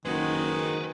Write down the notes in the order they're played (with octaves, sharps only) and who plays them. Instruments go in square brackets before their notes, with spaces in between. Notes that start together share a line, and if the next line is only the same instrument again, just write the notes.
[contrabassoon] F#1 [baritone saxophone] D#3 [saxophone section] G#3 F#4 [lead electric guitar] B4 C5